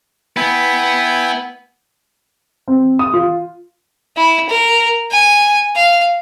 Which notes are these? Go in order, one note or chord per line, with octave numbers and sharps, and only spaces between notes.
B3 E4 G5 G#5
C4
D#6
F4
E4
A#4
G#5
F5